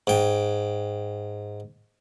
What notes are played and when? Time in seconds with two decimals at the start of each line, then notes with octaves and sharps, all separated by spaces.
0.07 G#2 G5